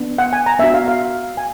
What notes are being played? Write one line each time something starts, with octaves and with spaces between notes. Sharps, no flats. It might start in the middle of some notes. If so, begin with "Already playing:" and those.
Already playing: B3 D4
F#5
G#5
A#5
B3 D4 F#4 E5
F5
F5
G#5